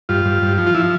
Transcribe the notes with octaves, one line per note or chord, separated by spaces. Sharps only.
G2 F4
G2
G2
F3
F4
F3 E4